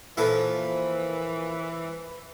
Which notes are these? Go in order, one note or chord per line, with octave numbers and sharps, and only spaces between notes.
A#2 E3 F3 E4 A4 B4